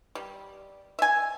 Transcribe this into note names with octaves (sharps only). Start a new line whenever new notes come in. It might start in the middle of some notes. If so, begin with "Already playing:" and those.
G3
E5 G#5